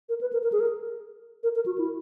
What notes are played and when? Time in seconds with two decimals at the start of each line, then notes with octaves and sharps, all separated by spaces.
0.09 A#4
0.21 B4
0.33 A#4
0.43 A#4
0.52 G#4
0.60 A#4
1.43 A#4
1.55 A#4
1.66 F#4
1.78 E4